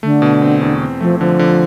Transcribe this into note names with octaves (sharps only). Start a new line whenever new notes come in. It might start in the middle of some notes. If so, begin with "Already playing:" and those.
D3 A3
B2
C4
E2
C4
F3 A3
D3 F3
D3